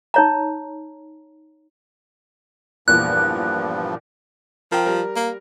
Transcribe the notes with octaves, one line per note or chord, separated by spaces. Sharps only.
D#4 C#5 A#5
E2 G2 A#2 F3 B3 F#6
F3 A#4 G5
G3 A#4
A#3